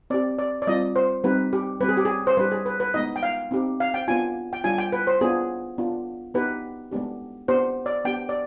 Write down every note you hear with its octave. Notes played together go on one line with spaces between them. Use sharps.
C4 G4 D5
D5
D5
G3 C4 F4 D#5
C5
G3 C4 D#4 G4 B4
G4
G3 C4 G4 B4
G#4
G4
G#4
C5
G3 D4 G4 B4
G#4
B4
B4
G#3 B3 D#4 D#5
G5
F5
C4 D#4 G4
F5
G5
B3 D4 F4 G#5
G5
G3 D4 F4 G#5
G5
B4
C5
B3 D4 F4 G#4
B3 D4 F4
B3 D#4 G4 B4
G#3 B3 D4 G4
B3 D4 G4 C5
D5
B3 D4 G4 G5
D5